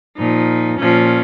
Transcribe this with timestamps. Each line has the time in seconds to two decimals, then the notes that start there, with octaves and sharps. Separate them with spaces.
0.18 A#2 F3 D#4
0.80 A#2 F3 C#4